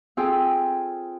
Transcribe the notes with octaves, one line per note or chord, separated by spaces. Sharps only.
C4 F4 G#4 A4 G5 G#5